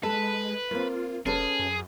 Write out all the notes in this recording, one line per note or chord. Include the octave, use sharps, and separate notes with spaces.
G#3 A4 B4
A#3 C4 F4
F1 C#4 G#4 A4 B4
F#2